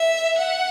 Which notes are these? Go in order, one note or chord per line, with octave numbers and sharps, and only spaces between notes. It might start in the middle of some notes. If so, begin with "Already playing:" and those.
Already playing: E5
F#5